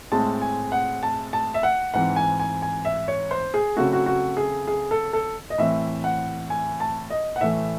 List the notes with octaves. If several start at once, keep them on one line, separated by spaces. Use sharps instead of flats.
A2 G#3 C4 A5
G#5
F#5
A5
A5
E5
F#5
G#2 E3 C4 F#5
G#5
G#5
G#5
E5
C#5
C5
G#4
C#3 F#3 A3 C4 F#4
F#4
F#4
G#4
G#4
A4
A4
D#5
A2 E3 C4 E5
F#5
G#5
A5
D#5
F#5
A2 E3 A3 E5